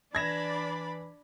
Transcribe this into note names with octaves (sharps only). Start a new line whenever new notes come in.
E3 D4 D5 B5 G#6 A#6 E7